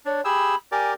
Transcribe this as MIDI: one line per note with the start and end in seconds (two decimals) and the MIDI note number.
0.05 0.21 62
0.05 0.24 73
0.25 0.55 67
0.25 0.55 68
0.25 0.55 83
0.25 0.55 88
0.72 0.94 67
0.72 0.94 70
0.72 0.94 74
0.72 0.91 80